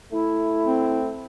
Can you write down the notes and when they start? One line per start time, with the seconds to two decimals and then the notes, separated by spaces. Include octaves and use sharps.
0.12 A3 E4
0.66 C4